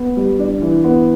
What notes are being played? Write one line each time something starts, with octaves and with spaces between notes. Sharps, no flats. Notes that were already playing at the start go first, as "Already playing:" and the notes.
Already playing: B3
G3
D4
E3
B3